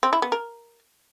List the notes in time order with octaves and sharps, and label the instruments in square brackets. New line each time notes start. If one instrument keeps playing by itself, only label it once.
[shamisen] C4
E4
B3
A#4